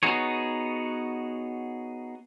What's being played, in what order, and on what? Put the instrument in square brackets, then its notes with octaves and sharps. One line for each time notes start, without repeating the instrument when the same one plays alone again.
[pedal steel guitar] B3 D#4 F#4 G#4 C#5